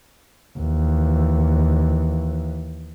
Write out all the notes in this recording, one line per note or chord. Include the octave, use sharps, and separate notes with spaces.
D#2 E3